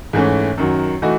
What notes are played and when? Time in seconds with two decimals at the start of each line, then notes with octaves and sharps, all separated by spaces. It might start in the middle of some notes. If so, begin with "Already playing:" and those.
0.13 G#2 E3 A3 C#4
0.58 F#2 D#3 F#3
1.02 E3 A3 D#4 F#4